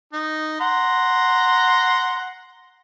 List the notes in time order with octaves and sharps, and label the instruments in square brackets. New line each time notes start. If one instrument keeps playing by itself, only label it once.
[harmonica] D#4
F#5 A#5 C6